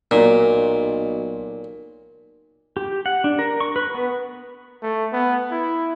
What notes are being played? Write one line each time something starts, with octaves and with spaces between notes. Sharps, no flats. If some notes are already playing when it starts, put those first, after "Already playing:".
B1 A#2
G4
F#5
D4
A#4
C#6
B4
B3
A3
B3
E4